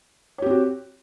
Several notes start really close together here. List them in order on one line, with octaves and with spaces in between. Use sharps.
C#5 G4 C4 F#4